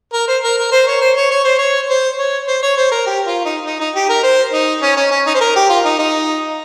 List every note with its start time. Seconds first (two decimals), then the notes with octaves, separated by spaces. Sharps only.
0.13 A#4
0.28 C5
0.43 A#4
0.58 A#4
0.72 C5
0.87 C#5
1.01 C5
1.16 C#5
1.31 C#5
1.44 C5
1.59 C#5
1.89 C5
2.19 C#5
2.47 C5
2.62 C#5
2.77 C5
2.91 A#4
3.06 G4
3.27 F4
3.45 D#4
3.66 D#4
3.80 D#4
3.95 G4
4.09 A#4
4.23 C5
4.53 D#4
4.82 C#4
4.97 C#4
5.11 C#4
5.26 D#4
5.35 C5
5.41 A#4
5.56 G4
5.70 F4
5.85 D#4
5.99 D#4